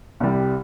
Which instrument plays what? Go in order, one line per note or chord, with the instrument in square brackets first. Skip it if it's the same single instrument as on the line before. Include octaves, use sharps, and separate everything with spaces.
[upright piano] C2 C3 G3